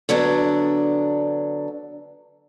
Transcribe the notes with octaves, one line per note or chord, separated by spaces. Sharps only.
D3 F#3 B3 D4